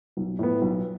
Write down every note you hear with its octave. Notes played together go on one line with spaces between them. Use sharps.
B1
A2 F3 B3
B1